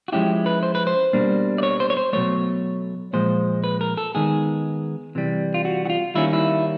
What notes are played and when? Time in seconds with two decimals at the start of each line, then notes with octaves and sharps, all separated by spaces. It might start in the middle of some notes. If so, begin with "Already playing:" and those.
0.08 F#4
0.12 F3 G#3 C#4 E4 G4
0.46 B4
0.63 C5
0.75 B4
0.87 C5
1.13 B2 G3 A#3 D4
1.58 D5
1.63 C#5
1.80 C5
1.90 C#5
1.97 C5
2.13 B2 F#3 A3 C#5
3.13 A#2 F3 G#3 C5
3.64 B4
3.81 A#4
3.97 A4
4.14 D#3 G#3 B3 G#4
5.15 C3 E3 G3
5.54 F4
5.65 F#4
5.86 F#4
5.90 F4
6.15 D#3 G3 A#3 C#4 E4
6.33 E4